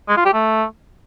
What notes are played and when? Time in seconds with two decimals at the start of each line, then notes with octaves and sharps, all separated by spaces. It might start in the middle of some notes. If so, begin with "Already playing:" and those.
0.09 G#3
0.17 F4
0.25 G4
0.33 A3